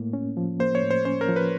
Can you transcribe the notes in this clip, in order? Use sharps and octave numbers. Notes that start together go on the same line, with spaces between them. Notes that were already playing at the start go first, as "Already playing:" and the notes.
Already playing: A2 A#3
C#4
F3
A#3 C5
C#5
A2
C5
C#4 C5
A#4
F3
B4